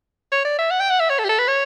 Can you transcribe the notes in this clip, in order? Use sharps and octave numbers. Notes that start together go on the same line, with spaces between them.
C#5
D5
E5
F#5
G5
F#5
E5
C#5
A4
G4
A4
B4
C#5